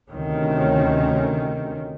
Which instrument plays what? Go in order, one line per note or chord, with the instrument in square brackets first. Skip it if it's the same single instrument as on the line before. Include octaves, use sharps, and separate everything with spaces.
[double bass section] D2 C3 D#3 C#4